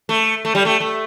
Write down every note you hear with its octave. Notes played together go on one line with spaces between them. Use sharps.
A3
A3
G3
A3
A3